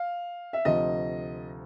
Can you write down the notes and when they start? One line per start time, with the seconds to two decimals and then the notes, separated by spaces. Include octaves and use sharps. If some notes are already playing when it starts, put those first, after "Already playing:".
Already playing: F5
0.53 E5
0.65 D2 C3 F3 D#5